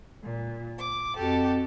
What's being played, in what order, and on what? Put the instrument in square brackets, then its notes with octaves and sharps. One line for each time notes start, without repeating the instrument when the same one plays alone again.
[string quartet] A#2
D6
[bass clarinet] F2 [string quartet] F#4 G4 A4